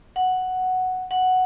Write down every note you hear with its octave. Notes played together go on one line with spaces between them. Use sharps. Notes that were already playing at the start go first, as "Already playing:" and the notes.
F#5
F#5